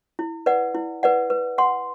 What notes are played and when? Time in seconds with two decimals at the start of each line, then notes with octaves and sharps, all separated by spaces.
0.19 E4
0.46 B4 D5 F#5
0.75 E4
1.03 B4 D5 F#5
1.30 B4
1.58 F#5 C6